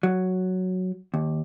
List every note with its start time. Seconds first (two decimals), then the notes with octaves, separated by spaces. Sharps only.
0.03 F#3
1.14 D#2